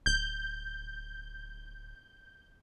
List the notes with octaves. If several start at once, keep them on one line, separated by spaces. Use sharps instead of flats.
D1 G6